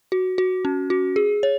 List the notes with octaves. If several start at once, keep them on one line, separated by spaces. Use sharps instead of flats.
F#4
F#4
C#4
F#4
G#4
C#5